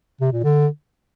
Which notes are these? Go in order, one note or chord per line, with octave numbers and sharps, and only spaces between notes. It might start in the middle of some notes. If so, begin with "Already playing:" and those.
C3
A#2
D3